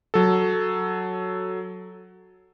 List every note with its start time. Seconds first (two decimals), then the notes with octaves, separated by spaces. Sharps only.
0.14 F#3 A4